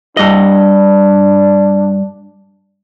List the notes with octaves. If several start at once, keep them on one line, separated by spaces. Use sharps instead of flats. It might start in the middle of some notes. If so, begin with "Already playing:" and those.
G2 D4 D#5